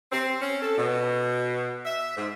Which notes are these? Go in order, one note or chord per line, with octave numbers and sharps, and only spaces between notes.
C4
C#4
A4
B2
E5
G#2